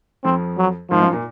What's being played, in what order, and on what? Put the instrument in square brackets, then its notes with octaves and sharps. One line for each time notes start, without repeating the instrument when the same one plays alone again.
[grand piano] F2 F3 [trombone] C4
[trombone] F#3
[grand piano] G#1 G#2 [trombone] F3
[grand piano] F#2
A#2